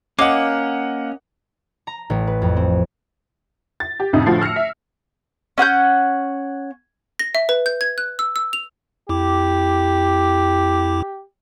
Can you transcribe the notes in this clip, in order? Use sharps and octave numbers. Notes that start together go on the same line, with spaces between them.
A#3 C#4 A#4 D#5 F#5 D6
A#5
A1
B4
F2
C4
A6
G4
A1 F2 C3 D#4
A2 D3 F3 F4 F#4 C7
E6 F6 A#6 C7 C#7
E5
C#4 F#5 C6 G6
A#6
E5
B4
G6
G#6
F#6
E6
E6
F7
F2 E4 G4 D6